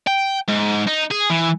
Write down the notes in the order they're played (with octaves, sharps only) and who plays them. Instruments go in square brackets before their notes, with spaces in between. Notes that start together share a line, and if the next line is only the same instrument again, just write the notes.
[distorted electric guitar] G5
G#2
D#4
G#4
E3